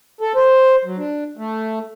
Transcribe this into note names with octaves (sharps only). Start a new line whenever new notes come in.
A4
C5
F#3
D4
A3